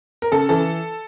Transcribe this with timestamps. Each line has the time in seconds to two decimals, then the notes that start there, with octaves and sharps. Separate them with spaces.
0.22 A#4
0.32 C#3 A4
0.49 E3 A4